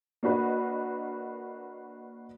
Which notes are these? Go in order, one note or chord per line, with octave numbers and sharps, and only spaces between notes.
A#3 D4 F#4 B4 D#5